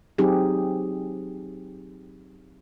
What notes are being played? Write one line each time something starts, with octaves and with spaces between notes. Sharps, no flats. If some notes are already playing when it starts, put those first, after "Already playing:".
F#3 C4 D#4 G4 G#4